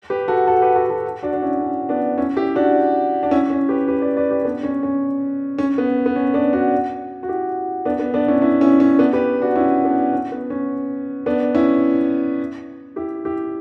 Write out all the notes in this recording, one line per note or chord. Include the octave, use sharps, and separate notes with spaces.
G4 B4
F#4 A4
F#4 A4
G4 B4
F#4 A4
F#4 A4
D4 F#4
D4
C#4 E4
C#4
B3 D4
C#4 E4
E4 G4
D4 F#4
D4
C#4 E4
C#4
G4 B4
G4 B4
B4 D5
B4 D5
G4 B4
B3 D4
C#4
C#4
C#4
B3
B3
C#4
B3 D4
D4 F#4
F#4
E4 G4
B3 D4
B3
B3 D4
C#4 E4
C#4 E4
C#4 E4
C#4
B3 D4
G4 B4
D4 F#4
C#4 E4
B3 D4
C#4
B3
C#4
B3 D4
C#4 E4
E4 G4
E4 G4